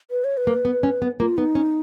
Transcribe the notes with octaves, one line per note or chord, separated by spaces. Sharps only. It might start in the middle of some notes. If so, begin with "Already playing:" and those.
B4
C#5
B4
A#3
B3
C#4
B3
A#3 F4
B3 D#4
C#4